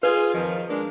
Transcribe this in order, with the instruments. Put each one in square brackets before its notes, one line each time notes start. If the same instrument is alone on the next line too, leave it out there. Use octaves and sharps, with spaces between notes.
[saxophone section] F4 G#4 [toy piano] B4
[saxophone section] F2 D#3 F3
G#3 A#3 D4